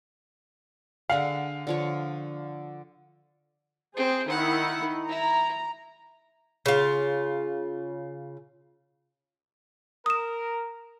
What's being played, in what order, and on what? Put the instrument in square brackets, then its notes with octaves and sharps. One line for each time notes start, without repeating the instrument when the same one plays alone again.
[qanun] D3 G#4 F#5 [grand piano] F5
[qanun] D3 F3 C#5
[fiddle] C4 [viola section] G#4 C5
[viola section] D#3 E4 [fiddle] F#5
[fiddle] E4 [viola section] A#5
[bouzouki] C#3 F4
[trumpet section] A#4 [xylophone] D#6 E7